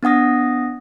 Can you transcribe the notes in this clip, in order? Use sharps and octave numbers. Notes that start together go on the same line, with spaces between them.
B3 D4 F#5 D#6 A#6